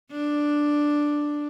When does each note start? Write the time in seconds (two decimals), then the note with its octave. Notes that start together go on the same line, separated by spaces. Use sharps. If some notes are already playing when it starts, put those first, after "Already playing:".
0.12 D4